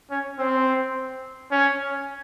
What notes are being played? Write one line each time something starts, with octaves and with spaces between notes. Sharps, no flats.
C#4
C4
C#4